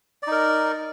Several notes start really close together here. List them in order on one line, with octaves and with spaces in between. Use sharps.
D5 D#4 A#4